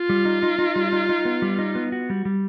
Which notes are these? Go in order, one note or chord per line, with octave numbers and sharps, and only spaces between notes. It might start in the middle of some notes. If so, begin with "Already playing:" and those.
Already playing: F4
G3
D#4
D#4
D#4
G3
D#4
D#4
B3
G3
D#4
B3
F#4
G3
G3